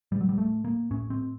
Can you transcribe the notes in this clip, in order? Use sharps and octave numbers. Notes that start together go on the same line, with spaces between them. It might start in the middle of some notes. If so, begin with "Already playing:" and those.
A2 G3
F#3
G3
A3
A#3
A2 C#4
C4